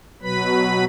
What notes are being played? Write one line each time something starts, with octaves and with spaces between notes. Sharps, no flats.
B2 F#3 B4 B5